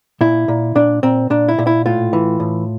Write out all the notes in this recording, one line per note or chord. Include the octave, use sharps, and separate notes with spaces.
A#2 E4
A#2
A#2 D4
A#2 C4
A#2 D4
E4
A#2
E4
A2 F4
E3
A2